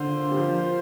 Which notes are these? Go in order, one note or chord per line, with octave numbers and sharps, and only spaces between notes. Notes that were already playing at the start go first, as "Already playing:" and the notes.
Already playing: D3 A#3 F4 C5
G3
F3